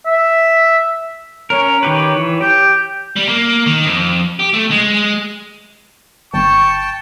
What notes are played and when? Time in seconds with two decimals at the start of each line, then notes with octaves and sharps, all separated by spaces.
0.06 E5
1.50 C#4 A#4 C#5
1.83 D#3 G4 B4
2.16 E3
2.41 G4 G6
3.16 G3
3.29 A#3
3.66 D#3
3.86 F2
4.39 G4
4.54 A3
4.71 G#3
6.34 G1 G5 A5 C#6